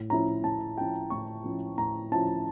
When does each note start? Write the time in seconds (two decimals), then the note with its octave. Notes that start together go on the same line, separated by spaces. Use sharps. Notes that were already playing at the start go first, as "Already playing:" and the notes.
Already playing: A2
0.10 F3 C#4 E4 A#5
0.44 A2 A5
0.78 F3 C#4 E4 G5
1.10 A2 C#6
1.44 F3 C#4 E4
1.78 A2 A#5
2.12 F3 C#4 E4 A5